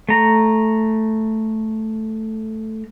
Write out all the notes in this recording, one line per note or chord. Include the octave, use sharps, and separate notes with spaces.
A3 A#5